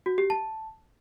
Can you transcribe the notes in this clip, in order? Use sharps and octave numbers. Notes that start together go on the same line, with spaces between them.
F#4
G4
A5